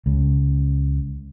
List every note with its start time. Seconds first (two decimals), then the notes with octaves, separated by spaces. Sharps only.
0.06 C#2 C#3